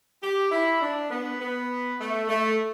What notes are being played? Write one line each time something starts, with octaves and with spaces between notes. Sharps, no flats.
G4
E4
D4
B3
B3
A3
A3